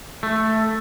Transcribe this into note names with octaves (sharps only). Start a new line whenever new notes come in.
A3